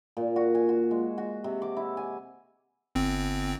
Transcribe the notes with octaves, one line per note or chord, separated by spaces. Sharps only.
A#2
F#4
G#5
F#4
G#3
F#4
C3
D6
E4
G#5
G1 C4